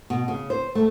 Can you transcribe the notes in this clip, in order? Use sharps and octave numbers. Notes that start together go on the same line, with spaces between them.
B2
C#3
C5
A3